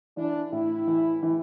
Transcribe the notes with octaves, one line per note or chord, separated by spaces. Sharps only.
E3 D4
A2 E4
E3
E3